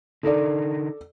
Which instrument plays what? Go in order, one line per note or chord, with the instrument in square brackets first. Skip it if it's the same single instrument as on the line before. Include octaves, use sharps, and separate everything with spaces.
[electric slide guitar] D3 D#4 A#4 [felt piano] A4 D5